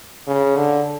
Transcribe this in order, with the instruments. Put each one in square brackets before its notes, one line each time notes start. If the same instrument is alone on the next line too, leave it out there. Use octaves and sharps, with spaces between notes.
[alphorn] C#3
D3